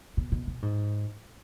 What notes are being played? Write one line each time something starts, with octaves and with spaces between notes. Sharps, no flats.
B2
B2
B2
G#2